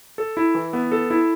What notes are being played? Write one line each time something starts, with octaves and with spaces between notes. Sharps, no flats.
A4
E4
E3
B3
A4
E4